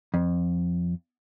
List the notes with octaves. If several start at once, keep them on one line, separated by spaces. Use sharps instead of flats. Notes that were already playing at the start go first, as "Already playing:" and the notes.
F2